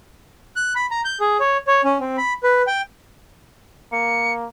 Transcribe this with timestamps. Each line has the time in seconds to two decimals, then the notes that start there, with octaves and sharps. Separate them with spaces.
0.56 F#6
0.75 B5
0.91 A#5
1.05 G6
1.20 G#4
1.40 C#5
1.67 C#5
1.84 C#4
2.01 C4
2.17 B5
2.43 B4
2.67 G5
3.92 A#3 C#7